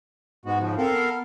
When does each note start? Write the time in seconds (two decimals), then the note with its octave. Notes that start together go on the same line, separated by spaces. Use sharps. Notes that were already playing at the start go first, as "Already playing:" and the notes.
0.46 G#2 G#3 B3 F#4
0.59 C#3 F3
0.77 C4 A4 A#4 F5
0.91 B3